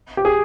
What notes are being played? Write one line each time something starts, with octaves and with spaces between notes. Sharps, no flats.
G4
G#4